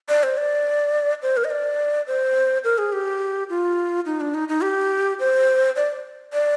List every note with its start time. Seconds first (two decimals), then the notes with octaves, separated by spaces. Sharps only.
0.09 D5
0.23 C5
0.37 D5
1.22 C5
1.37 A#4
1.44 D#5
1.51 D5
2.07 C5
2.64 A#4
2.78 G#4
2.93 G4
3.49 F4
4.06 D#4
4.21 D4
4.34 D#4
4.48 D#4
4.63 G4
5.19 C5
5.76 D5
6.33 D5